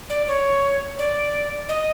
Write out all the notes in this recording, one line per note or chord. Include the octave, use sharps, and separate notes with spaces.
D5
C#5
D5
D#5